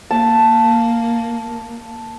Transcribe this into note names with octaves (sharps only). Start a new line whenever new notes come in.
A#3 A5